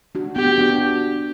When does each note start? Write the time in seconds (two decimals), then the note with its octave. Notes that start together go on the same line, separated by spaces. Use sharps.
0.15 D4 F#4
0.36 B3 G4
0.58 D4 F#4